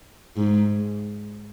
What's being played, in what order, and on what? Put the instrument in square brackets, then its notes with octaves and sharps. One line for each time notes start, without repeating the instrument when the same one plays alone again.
[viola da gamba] G#2